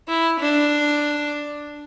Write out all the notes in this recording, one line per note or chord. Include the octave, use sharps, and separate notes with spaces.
E4
D4